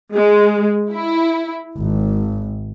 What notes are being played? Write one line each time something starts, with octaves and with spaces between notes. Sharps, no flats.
G#3
E4
G#1